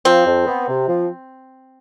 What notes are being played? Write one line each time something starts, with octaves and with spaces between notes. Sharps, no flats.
F3 C4
F2
B3
C3
F3